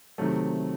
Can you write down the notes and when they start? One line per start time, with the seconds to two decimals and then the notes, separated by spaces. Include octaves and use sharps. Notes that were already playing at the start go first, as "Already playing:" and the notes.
0.18 C3 D#3 F#3 A3